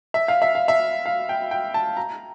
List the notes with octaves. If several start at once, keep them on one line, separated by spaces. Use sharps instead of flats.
E5
F5
E5
F5
E5
F5
G5
G5
A5
A#5